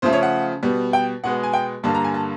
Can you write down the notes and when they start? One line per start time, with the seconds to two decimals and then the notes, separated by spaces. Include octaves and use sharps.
0.02 C#3 F3 A3 C5
0.13 C#5
0.23 F#5
0.63 B2 G3 B3
0.93 G5
1.24 B2 G#3 B3 F#5
1.43 G#5
1.53 G5
1.83 G2 D3 G3 A#3 A5
1.94 A#5
2.04 G#5
2.14 A5